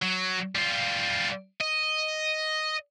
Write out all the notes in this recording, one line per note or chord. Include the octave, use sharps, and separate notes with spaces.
F#3
G3 F4
D#5